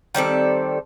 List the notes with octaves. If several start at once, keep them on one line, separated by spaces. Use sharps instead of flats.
D#3 G3 C4 A4